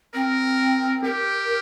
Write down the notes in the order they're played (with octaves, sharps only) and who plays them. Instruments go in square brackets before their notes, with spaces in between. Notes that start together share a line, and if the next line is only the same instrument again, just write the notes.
[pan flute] C4 [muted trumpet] A#4
[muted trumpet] G4 [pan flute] A#4